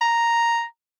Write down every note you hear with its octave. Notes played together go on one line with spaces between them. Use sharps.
A#5